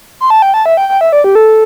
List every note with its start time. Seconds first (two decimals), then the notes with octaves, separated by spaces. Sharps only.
0.20 C6
0.30 A5
0.42 G5
0.54 A5
0.66 E5
0.77 G5
0.89 G5
1.01 E5
1.12 D5
1.24 G4
1.35 A4